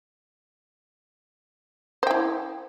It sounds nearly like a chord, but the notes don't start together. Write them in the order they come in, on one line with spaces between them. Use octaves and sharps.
C5 G5 E4